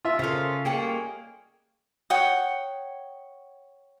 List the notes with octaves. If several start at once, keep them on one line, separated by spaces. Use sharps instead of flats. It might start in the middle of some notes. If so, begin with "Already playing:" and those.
F4 E5
C#3 A#3 G#4 A4 C5 F5
G3 G#3 A#3 C#4 G#4 A4 F#5 G5
C#5 F#5 G5 D#6